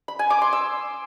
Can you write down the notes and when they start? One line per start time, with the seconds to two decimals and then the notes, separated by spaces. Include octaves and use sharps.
0.08 B5
0.19 G#5
0.30 D6
0.42 C6
0.53 E6